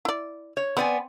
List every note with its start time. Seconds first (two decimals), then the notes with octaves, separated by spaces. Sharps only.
0.05 E4 D5
0.57 C#5
0.77 B3 C4 D5 G#5